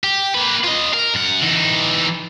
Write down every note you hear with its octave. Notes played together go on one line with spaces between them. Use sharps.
G4
A#3 B4
F4 D#5
A#4
F#2 F#5
E3 D#4